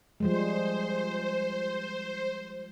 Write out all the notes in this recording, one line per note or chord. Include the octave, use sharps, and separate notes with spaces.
F3 G3 G#3 C5